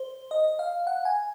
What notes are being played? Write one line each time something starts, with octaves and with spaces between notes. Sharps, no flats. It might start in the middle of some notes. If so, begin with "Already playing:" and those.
Already playing: C5
D#5
F5
F#5
G#5